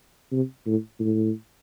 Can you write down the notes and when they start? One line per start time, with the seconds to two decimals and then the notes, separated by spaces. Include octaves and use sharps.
0.32 C3
0.66 A2
1.00 A2